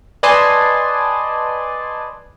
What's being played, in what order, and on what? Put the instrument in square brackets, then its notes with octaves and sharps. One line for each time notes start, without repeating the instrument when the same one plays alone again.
[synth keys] B4 D5 D#5 G#5 A5 C6